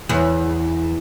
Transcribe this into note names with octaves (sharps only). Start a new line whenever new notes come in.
E2